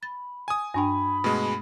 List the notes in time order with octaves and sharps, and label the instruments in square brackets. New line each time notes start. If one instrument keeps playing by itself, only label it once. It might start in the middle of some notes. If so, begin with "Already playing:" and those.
[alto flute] B5 [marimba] A6
[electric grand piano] G#5 D#6
[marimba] G2 D4 G5 [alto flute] B5
[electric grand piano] B2 G#3 [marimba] A3